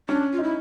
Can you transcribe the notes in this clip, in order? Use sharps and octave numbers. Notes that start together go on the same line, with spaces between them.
C#4 D4
F4
D#4
E4